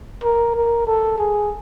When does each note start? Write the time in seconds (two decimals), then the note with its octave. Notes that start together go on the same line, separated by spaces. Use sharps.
0.24 A#4
0.55 A#4
0.87 A4
1.18 G#4